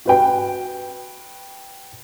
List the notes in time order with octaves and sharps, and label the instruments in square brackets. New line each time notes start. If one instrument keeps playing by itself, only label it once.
[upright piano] F#4 B4 G5